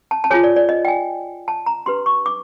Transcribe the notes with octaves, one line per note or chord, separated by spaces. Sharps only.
A5
A5
F4 G#4 C#5 G#5
D5
D5
D#5
G5
G#5
A5
A#5
D4 G4 B4 C6
C#6
D6